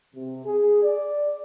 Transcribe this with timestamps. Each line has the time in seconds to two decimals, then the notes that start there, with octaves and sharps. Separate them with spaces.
0.15 C3
0.45 G#4
0.84 D5